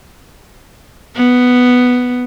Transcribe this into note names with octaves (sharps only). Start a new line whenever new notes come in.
B3